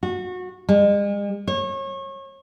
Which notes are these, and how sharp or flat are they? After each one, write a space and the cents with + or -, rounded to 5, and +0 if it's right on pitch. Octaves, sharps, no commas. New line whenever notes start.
F#4 -25
G#3 -40
C#5 -30